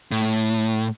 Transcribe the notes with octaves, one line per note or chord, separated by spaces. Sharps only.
A2